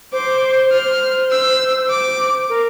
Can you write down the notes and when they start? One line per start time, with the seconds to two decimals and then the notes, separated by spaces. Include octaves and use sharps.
0.12 C5 D6
0.72 C5 F6
1.31 E6
1.90 D6
2.49 A#4